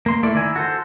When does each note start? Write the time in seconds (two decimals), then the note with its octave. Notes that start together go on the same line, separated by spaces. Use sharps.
0.06 A#3 C6
0.23 A3 A#3 E4 D5
0.35 D#3 E4 G#5
0.55 F#4 A4 C5